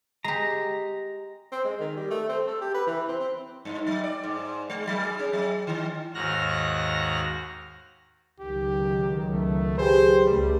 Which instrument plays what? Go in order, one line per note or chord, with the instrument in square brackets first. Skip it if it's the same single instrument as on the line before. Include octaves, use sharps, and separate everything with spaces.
[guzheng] G#3 G4 [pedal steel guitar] A#5
[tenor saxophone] C4
G#3
D#3
G3
A3
C4
A4
G4
B4
E3
C4
C4
[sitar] G2
F#3
D5
G#2
G#3
F#3
G#4
C#4
F#3
D#3
[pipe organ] D#2 G#2 F#4 F6 F#6 A#6
[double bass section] C#2 D#3 F#3 [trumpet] G4
[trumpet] A3
[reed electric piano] G4 G#4 B4 [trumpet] C5
[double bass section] C#2 A3 [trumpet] G3